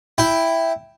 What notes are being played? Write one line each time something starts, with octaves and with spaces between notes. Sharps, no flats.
E4 G5